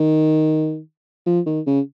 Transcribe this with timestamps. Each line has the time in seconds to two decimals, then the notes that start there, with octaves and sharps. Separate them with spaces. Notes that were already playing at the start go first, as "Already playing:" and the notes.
Already playing: D#3
1.26 F3
1.46 D#3
1.67 C#3